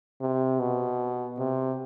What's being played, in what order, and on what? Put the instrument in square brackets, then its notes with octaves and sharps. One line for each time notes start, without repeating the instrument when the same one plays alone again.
[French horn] C3
B2
C3